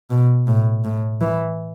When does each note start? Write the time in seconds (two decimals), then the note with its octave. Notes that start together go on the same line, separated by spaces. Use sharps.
0.10 B2
0.47 A2
0.85 A2
1.21 E3